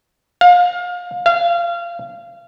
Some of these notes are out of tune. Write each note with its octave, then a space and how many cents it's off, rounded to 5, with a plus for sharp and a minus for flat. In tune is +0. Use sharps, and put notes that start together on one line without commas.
F5 +30
F5 -25